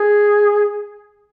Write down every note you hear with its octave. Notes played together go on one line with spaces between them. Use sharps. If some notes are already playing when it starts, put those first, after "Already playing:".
Already playing: G#4